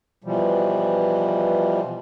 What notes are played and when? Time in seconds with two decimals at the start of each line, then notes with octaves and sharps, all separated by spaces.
0.24 B2 E3 F3 G3